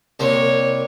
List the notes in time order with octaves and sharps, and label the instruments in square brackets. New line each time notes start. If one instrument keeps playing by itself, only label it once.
[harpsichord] C2 A#3 [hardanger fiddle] C#5